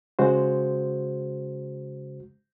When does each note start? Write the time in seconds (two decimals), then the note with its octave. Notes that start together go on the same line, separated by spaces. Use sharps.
0.19 C#3 G#3 F#4 C5